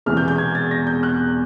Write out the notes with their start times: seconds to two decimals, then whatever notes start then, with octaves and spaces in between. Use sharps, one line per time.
0.06 E1 E2 C3 E3 F6
0.17 G6
0.28 G6
0.38 G#6
0.55 A6
0.71 A#6
0.87 G6
1.03 F#6